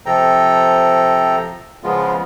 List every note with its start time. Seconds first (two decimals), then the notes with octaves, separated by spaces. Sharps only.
0.06 C3 F3 A4 G5 A#5
1.84 C#3 F3 G#3 B3 F4